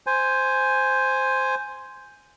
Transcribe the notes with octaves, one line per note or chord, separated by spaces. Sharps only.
C5 G#5